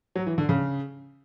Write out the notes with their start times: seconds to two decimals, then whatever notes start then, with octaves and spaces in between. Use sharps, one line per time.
0.15 F#3
0.27 E3
0.38 D3
0.49 C#3